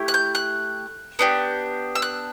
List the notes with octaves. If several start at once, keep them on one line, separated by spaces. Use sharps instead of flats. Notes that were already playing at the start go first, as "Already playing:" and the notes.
Already playing: A3 E4 G4
F#6
G6
F#6
B3 D4 G4
E6
F#6